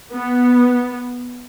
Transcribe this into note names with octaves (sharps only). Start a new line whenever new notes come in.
B3